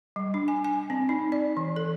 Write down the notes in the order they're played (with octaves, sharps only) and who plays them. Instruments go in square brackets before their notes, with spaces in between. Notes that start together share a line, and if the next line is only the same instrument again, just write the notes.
[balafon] G3
D4
G#5
G#5
C4
D#4
D5
E3
A4